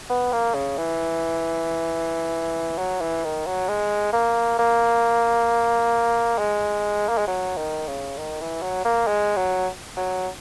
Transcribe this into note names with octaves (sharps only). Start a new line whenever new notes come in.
B3
A#3
C#3
E3
F#3
E3
D#3
F#3
G#3
A#3
A#3
G#3
A#3
G#3
F#3
D#3
C#3
D#3
E3
F#3
A#3
G#3
F#3
F#3